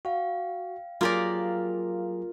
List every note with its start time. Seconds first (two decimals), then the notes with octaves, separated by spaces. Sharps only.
0.05 F#4 F5 G5
1.01 F#3 A#3 F4 G4 G#4 A#4 D5